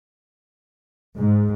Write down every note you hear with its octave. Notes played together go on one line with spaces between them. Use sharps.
G#2